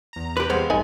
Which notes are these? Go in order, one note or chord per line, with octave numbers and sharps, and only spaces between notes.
E2 A#5
G4 B4
E2 G3 G#3 B3 C4 C5 F5
A1 G2 D#4 D5 G#5